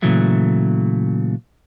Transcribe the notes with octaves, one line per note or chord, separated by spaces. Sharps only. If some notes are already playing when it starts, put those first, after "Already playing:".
A#2 C#3 E3 F#3 A3